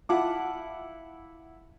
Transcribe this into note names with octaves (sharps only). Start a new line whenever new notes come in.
E4 F4 F#5 A5 D6